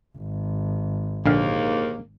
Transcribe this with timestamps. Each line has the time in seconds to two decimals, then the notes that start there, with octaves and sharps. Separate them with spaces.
0.17 G#1
1.26 A#1 D#2 G#2 D3 A#3 F5